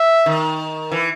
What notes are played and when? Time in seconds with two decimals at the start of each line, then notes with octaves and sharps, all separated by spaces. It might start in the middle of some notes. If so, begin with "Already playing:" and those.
Already playing: E5
0.26 D#3
0.92 E3